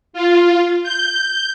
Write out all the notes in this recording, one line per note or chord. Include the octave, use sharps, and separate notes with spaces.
F4
G6